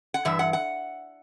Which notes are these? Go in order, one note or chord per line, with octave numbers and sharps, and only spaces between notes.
F#5
G2 E3 E5
F#5
F#5